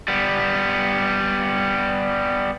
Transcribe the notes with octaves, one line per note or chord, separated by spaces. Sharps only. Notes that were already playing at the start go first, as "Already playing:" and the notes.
G3 B3